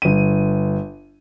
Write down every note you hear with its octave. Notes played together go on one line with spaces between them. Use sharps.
G1 D#7